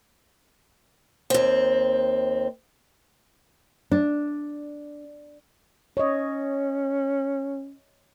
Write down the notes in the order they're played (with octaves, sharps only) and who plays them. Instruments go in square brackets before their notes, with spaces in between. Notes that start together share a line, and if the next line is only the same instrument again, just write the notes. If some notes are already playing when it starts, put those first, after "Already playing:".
[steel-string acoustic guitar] D#2 C4
[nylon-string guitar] D4
[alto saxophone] C#4 [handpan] C#5 D#5